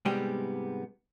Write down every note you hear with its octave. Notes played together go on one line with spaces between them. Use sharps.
G#2 C3 G3 G#3 B3 G4